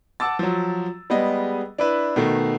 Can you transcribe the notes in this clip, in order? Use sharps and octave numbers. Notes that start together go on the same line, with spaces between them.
F#5 A5 D6 E6 A6
F3 F#3
G3 G#3 B3 G#4 D#5
D4 E4 B4
B2 D#3 A3